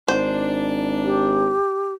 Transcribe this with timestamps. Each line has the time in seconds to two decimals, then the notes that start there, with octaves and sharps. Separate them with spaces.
0.08 G#1 D4 C5
1.05 G4